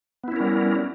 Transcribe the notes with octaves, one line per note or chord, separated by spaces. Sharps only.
G3 B3 C#4 E4 A#4